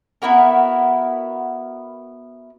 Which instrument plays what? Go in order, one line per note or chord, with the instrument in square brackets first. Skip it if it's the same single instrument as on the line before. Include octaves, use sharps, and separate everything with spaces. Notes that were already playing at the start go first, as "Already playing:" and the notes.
[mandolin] B3 E4 F#4 A#4